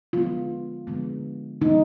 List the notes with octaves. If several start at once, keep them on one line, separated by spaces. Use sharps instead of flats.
D3 F3 G#3 B3 F4
D3 F3 G#3 B3
D3 F3 G#3 B3 D#4